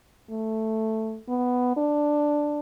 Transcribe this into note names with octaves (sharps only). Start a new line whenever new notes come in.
A3
B3
D4